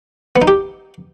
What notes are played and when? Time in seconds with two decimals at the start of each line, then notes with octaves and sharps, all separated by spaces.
0.36 B3
0.42 D#4
0.48 G4